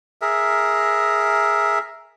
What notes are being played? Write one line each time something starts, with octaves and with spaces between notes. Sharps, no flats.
G#4 A#4 E5